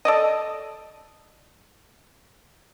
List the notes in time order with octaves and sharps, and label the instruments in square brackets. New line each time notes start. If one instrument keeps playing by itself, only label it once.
[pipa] A4 D5 D#5